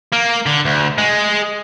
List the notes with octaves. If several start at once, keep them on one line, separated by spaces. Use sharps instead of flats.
A#3
D3
D2
G#3